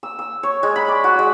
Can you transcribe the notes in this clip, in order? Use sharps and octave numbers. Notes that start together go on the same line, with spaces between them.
E6
E6
C#5
G#3
B5
D5
F#4
G#3